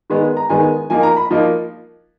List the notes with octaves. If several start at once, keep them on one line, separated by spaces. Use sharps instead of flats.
D#3 G#3 B3
A#5
D#3 G#3 B3 G#5
F3 A#3 D#4 G#5
A#5
B5
F3 A#3 D#4